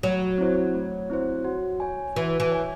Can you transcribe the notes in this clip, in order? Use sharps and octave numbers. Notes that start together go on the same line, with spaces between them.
F#3 A3
C4 E4 C5
A3
C4 E4 C5
F#4
C#5 G#5
E3 F#4
E3
C#5 G#5